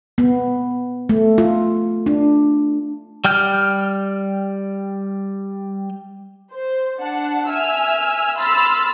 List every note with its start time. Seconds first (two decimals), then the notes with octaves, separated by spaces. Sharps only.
0.18 B3
1.09 A3
1.38 F4
2.06 D4
3.25 G3 G5 F6 G6
6.52 C5
7.00 D4 F#5 A5
7.50 E5 G#5 E6 F6
8.38 B5 C6 E6 F6 A6